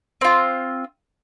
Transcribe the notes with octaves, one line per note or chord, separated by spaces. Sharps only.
C4 F4